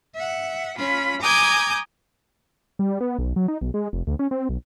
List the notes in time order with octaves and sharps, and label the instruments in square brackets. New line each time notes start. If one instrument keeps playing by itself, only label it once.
[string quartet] E5 F#5
C#4 F4 B5
G#5 A#5 D6 D#6 G6 G#6
[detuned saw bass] G3
B3
B1
F#3
D#4
B1
G#3
F1
D2
C#4
C4
B1